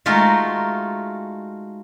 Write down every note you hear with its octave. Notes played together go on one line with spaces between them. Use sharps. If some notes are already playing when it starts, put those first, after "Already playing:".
G#3 A3 D#4 F4 F#4 A#4